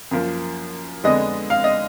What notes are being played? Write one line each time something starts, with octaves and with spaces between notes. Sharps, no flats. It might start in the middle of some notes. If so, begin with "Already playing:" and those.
F#2 F3 A#3
F2 D3 G#3 B3 D#5
F5
D#5